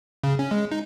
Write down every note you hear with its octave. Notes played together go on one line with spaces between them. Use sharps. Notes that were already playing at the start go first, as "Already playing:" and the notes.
C#3
C#4
G#3
D#4